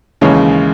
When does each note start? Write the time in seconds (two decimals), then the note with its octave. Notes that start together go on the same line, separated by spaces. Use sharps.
0.21 D#2 C#3 E3 G#3 C#5